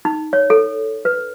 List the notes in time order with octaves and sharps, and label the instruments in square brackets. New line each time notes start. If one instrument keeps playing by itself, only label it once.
[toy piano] D#4
C#5
A4
B4